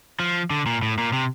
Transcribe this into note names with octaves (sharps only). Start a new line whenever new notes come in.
F3
D3
A#2
A2
A#2
C3